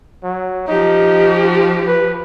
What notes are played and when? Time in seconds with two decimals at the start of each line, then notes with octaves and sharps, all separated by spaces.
0.23 F#3
0.68 F3 D#4 G4
1.87 B4